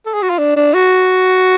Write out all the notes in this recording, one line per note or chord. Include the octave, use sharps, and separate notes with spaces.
A4
G#4
F#4
F4
D4
D4
F#4